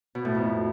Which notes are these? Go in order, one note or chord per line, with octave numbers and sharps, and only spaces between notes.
B2
A2
F2